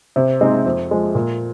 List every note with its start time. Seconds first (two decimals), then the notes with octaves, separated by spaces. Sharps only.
0.16 C3
0.41 G#3 C4 D#4
0.65 F2
0.91 F3 G#3
1.15 A#2